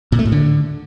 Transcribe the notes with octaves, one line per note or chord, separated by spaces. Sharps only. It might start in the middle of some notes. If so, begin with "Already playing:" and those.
A#2
A3
A2
D3